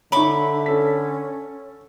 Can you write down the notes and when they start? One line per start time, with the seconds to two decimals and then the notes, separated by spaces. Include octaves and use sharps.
0.12 D3 D#4 C#5 E5 B5 C#6 D6
0.66 C#4 A4 B6